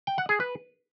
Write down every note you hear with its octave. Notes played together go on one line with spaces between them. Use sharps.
G5
F#5
G#4
B4